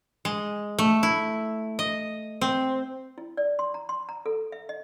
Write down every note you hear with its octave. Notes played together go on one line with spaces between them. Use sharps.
G#3
A3
E4
D#5
C4
E4
D5
C6
A#5
C6
A#5
A4
E5
D#5